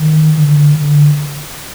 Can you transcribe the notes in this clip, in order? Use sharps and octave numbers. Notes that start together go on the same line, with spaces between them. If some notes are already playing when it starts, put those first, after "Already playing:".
Already playing: D#3
D3
D3